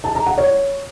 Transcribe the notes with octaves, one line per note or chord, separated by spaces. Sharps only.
A5
A#5
F#5
C#5